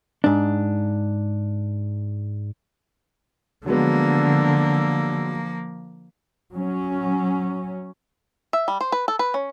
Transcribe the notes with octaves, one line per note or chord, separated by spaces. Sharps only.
G#2 D4
D3 F3 F#3 G#3 A#3 B3
F#3 C#4
E5
G3
C5
B4
A4
B4
C#4